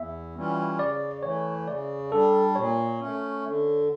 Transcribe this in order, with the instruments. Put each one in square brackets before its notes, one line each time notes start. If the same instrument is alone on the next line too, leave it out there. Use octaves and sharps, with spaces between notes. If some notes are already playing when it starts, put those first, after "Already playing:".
Already playing: [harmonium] E2 [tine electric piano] E5
[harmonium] E3 G3 C#4 F4
[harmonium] C#3 [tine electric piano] D5
[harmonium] E3 A3 [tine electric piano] C#5
[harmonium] C#3 [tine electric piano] D5
[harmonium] G3 D4 [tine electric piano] A4
[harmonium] A#2 [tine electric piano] C#5
[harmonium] A3 C#4
D3